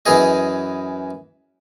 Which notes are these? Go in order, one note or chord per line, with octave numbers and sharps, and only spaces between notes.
F#2 E3 G#4 D#5